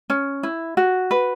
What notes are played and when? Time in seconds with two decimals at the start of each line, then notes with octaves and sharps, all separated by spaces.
0.10 C#4
0.43 E4
0.77 F#4
1.11 B4